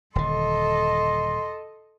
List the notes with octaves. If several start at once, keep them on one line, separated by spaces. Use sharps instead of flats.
D#1 D3 A4 D#5 C6